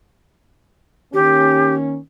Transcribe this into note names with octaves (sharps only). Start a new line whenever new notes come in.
D#3 A#3 C#4 G4